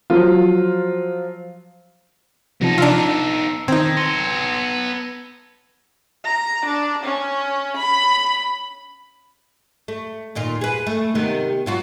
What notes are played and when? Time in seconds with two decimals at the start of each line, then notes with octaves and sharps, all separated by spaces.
0.10 F3 F#3 F4
2.61 C3 F3 B3 D#4 A5 D#7
2.78 D4 F4 A5 A#5 E6
3.68 D#3 C4 D#4 G#6
3.97 B3 C6 A#6 C#7 D#7
6.25 A#5
6.65 D4
7.04 C#4
7.77 B5
9.88 A3
10.35 D#2 A#2 F4
10.61 G#4 B4
10.87 A3
11.15 C3 D#3 B3
11.66 F#3 F4 F#4